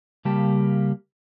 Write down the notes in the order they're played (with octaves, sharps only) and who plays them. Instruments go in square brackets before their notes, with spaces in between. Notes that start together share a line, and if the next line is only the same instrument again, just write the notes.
[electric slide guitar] C#3 G3 A#3 G4 A5